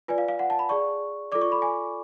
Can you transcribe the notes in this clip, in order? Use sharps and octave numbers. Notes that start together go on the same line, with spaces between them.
F4 B4 D5 G#5
F5
F5
F#5
A5
B5
G#4 D5 C#6
F4 A4 D5 D6
C#6
B5
G#5